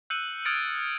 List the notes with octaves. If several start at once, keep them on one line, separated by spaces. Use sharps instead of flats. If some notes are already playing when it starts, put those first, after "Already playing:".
E6 F#6 G6 C#7 D#7 F#7
D#6 F6 G#6 A6 C#7 D7